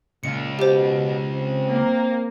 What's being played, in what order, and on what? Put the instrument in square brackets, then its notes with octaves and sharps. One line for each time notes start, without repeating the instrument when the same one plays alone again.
[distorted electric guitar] C#2 F4 [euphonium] A#2 [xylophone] C#7
[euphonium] B2 [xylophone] G4 C5
[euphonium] C4
[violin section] A#3